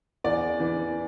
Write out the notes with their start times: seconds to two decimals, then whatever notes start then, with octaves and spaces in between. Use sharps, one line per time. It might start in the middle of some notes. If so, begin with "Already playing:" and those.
0.24 E2 D5
0.60 E3